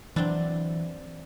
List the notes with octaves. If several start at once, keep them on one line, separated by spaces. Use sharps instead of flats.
E3 F#3 C4 D4